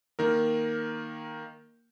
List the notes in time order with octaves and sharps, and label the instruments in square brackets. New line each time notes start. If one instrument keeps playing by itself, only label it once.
[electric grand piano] D#3 A#3 A#4